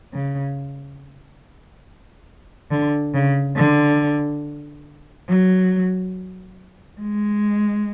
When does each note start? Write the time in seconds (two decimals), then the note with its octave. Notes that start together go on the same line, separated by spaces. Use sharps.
0.13 C#3
2.71 D3
3.14 C#3
3.57 D3
5.29 F#3
7.00 G#3